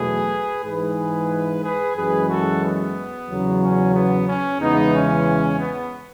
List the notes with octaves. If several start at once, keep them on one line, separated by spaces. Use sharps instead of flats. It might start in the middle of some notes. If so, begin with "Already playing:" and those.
Already playing: E2 B2 F#3 A3 G#4 B4
G#2 E3 G#3 G#4 B4
G#4 B4
F#2 E3 G#3 G#4 B4
F#4 A4
B3
E2 C#3 F#3
C#4
B3
C#4
E2 C#3 E3 G#3 B3 D#4
C#4
B3